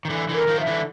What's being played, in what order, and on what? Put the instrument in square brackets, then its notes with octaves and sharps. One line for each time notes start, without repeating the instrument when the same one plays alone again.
[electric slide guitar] D#3
D3 E3
D3 E3
[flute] A#4
[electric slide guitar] D#3 F3
[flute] E5
[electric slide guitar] D3 E3